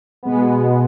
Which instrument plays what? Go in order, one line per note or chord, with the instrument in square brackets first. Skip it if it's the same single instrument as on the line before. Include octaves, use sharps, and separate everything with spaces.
[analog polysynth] B2 G#3 B3